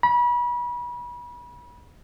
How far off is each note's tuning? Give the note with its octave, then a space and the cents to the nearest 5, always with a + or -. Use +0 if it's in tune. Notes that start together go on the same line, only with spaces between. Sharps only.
B5 -35